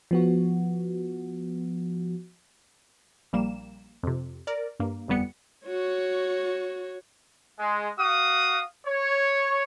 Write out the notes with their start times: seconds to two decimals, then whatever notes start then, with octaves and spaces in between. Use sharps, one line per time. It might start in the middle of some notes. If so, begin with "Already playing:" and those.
0.11 F3 B3 F#4
3.33 A#1 G3 A#3 E7
4.03 F2 C3
4.47 A#4 D5
4.80 G2 A#3
5.08 G1 F2 G3 B3 C#7
5.66 F#4 C#5
7.59 G#3
7.98 F#4 F5 D#6
8.86 C#5